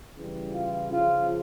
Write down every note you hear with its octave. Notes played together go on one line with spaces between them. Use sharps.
C#3 E3 G3
F4
C#3 F3 F4